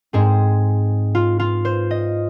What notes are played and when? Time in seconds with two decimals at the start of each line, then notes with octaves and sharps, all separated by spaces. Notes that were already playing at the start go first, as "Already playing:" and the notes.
0.13 G#2 G#3 C4 G#4
1.15 F4
1.39 F4
1.65 C5
1.91 D#5